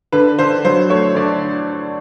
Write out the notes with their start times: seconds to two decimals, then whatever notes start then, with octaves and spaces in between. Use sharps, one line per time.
0.12 D3 B4
0.39 D3 C5
0.65 F#3 C5
0.89 A3 C#5
1.15 D3 D5